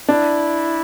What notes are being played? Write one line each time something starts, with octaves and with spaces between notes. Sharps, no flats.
D4 E4